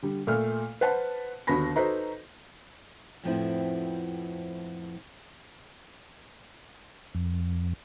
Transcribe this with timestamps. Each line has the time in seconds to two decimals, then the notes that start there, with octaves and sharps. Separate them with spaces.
0.02 D3 G3
0.27 A#2 A3 A4 F6
0.81 B4 C5 F#5 A5
1.47 D#2 D3 B3 F#4 B5 A#6
1.76 D#4 F#4 A4 B4 C5 D#5
3.23 F2 A2 F3 B3 C4 E4
7.15 F2